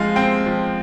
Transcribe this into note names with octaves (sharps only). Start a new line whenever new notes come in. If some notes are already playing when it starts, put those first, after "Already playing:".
Already playing: F3 G#3 C4 D#5 F5
C4 G5
F3